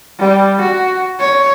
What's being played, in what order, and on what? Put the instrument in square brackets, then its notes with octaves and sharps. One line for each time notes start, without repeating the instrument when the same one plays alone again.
[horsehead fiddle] G3
F#4
C#5